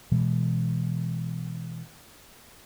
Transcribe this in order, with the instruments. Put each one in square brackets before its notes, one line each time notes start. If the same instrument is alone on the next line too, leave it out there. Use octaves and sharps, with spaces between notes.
[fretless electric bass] B2 E3 G#3